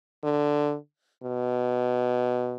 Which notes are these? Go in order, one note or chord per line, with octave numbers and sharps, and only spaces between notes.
D3
B2